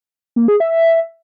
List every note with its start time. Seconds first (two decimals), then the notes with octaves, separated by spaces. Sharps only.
0.36 A#3
0.48 G#4
0.60 E5